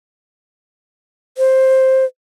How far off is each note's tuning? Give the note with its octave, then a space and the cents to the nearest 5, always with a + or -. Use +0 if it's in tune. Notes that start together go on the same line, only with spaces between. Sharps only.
C5 +10